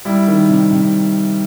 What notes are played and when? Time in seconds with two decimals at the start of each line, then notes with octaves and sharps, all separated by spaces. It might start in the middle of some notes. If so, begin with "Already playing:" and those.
0.05 G3 E4
0.28 D#3
0.49 C3
0.71 C3